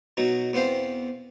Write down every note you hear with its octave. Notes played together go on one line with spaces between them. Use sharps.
B2 F#3 D#4 F#4
E2 B3 C4 C5 F5